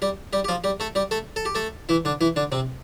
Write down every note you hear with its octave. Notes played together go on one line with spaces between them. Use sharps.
G3 G4
G3 G4
G4
F3 F4
G3 G4
A3 A4
G3 G4
A3 A4
A4
G4
A3 A4
E3 E4
D3 D4
E3 E4
D3 D4
C3 C4